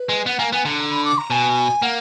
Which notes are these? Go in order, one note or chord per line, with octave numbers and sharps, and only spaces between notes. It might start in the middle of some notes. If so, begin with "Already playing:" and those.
Already playing: B4
G#3
B3 F#5
A#3 G#5
B3 G#5
D3 A#5
A#5
B5
D6
A#5
B2 G#5
A#3 F#5